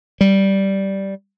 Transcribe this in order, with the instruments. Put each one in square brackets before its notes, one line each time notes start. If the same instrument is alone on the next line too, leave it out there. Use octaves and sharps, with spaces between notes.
[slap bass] G3